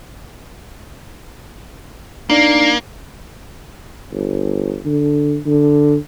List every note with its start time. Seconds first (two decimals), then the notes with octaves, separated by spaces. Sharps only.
2.30 A#3 D4 D#4 D5
4.12 G1
4.85 D3
5.46 D3